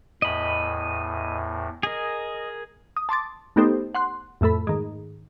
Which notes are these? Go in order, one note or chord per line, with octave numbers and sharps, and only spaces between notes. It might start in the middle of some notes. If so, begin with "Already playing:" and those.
E2 A2 D#5 B5
G#4 A#4 D#5
D#6
A5 C6 D6 A6
A3 B3 D#4 G4 A4 C5
F#5 C6 F#6
F2 A2 A3 A4 B5
G#2 D#3